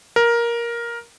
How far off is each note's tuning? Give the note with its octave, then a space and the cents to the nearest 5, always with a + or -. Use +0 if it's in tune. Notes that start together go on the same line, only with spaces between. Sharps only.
A#4 +10